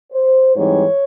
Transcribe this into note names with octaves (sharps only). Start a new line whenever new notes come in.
C5
G#2 E3 G3 C4 D#4 C#5